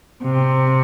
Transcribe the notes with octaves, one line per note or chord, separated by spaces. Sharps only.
C3